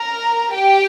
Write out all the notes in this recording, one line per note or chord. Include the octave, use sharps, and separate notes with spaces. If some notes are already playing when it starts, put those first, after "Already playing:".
Already playing: A#4 A#5
G4 G5